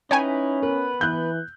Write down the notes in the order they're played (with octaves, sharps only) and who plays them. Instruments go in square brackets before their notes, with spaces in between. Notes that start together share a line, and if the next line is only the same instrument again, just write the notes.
[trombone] C#4 [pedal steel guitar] D#4 E4 B4 [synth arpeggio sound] C#5 G5 G#5
[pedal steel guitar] B3 B4 [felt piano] A#4
[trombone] E3 [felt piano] F#6 G6